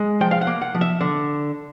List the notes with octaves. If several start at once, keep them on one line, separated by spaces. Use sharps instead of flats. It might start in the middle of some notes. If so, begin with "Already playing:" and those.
Already playing: G#3
F3 G5
F5
F#5
A#3
F#5
F3
E5
D3